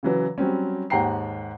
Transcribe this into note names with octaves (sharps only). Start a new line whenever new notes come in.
C#3 E3 F#3
F#3 G3 C4 C#4
D#2 G#2 F#5 G5 A#5 C7